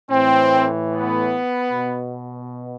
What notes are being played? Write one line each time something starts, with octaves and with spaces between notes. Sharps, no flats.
A2 E3 C4
B3
B2